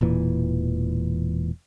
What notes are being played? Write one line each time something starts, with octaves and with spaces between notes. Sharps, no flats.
E1 A#2 E3